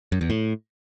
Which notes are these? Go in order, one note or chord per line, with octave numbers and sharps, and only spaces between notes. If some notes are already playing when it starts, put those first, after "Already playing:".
F#2
E2
A2